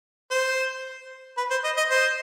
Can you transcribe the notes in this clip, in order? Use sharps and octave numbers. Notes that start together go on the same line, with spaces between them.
C5
B4
C5
D#5
D#5
C5